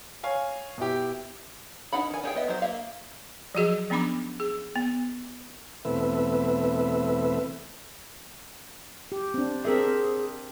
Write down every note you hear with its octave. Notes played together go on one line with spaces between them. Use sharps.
C#5 F5 G#5
B2 E4 G4
D4 D#4 F#5 B5
D#3 G#5
D4 G4 G#4 G5
B3 D#5 E5
F#3 C5
A#3 E5 F5
F3 F#3 F#4 G#4 D#5
F3 B3 C#4 D4 B5 D6
G#4
B3
E2 B2 A3 C4 B4 E5
G4
C4 D4
C4 G#4 A#4 E5